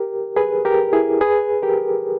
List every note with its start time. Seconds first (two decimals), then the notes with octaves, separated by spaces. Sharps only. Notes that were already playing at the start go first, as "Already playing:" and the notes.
Already playing: G4 A#4
0.36 G#4 B4
0.65 G4 A#4
0.93 E4 G#4
1.21 G#4 B4
1.63 G4 A#4